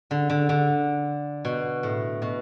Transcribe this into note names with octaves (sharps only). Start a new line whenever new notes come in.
D3
D3
D3
B2
A2
B2